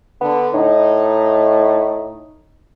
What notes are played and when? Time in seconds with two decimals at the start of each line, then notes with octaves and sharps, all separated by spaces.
0.21 D3 B3
0.54 A2 D#4